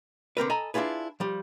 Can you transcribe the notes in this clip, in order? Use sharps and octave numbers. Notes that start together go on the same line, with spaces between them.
D3 C4 A#4 B4
A4 D#5 G#5 A#5 B5
D4 E4 F4 G#4 B4
F3 G3